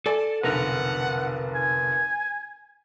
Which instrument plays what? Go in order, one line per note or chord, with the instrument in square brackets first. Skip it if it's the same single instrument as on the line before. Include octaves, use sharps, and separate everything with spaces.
[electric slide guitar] A4 [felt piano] D5 G#5
[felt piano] F1 B1 D3 [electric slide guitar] A#4 B4 [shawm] F#5
[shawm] G#5